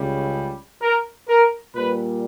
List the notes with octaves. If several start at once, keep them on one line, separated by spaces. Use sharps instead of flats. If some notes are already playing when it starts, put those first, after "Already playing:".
Already playing: C#2 C#3 G3
A#4
A#4
A#2 G3 B4